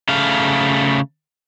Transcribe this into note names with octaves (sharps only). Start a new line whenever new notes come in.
C#3 A3 F5